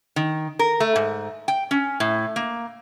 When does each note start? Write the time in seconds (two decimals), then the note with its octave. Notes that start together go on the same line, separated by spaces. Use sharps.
0.16 D#3
0.59 A#4
0.80 A3
0.96 G#2
1.48 G5
1.71 C#4
2.00 A2
2.36 A#3